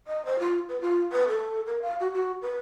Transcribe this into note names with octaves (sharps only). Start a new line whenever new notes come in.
D#5
C5
F4
B4
F4
B4
A4
A#4
F5
F#4
F#4
B4